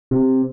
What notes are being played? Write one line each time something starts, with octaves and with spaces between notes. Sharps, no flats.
C3